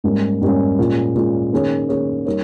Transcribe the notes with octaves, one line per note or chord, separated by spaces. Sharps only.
G#2 G3 A#3 C#4
G#2 G3 A#3 C#4
A#2 G#3 C#4
A#2 G#3 C#4
D#3 A#3 C#4 G#4 C#5
D#3 A#3 C#4 G#4 C#5
G3 A#3 D#4 A#4 C#5